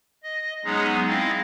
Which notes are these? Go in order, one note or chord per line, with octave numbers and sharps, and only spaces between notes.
D#5
F#3 G#3 B3 C#4 D#4 G#4
C4 E4 D#5 F5 A6